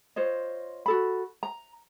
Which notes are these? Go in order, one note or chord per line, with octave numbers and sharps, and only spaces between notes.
F4 C5 C#5 D#5
F#4 A4 B5
A#5